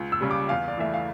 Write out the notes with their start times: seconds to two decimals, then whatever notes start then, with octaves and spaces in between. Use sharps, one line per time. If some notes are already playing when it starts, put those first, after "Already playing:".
Already playing: C#2
0.12 E6
0.21 C#3 G3
0.31 D6
0.49 E2 F5
0.68 D5
0.77 E3 A3 E5
0.94 F5